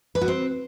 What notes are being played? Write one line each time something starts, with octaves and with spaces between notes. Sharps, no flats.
B4
F#4
C4